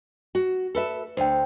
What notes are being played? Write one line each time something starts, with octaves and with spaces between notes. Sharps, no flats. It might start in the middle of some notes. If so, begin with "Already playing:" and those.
F#4
A4 B4 E5
D2 C5 G5